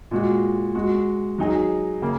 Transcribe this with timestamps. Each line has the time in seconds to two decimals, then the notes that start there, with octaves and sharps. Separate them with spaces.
0.11 A#2 G#3 F#4
0.75 G#3 F#4
1.38 F#3 D#4 G#4
2.02 C#3 A#3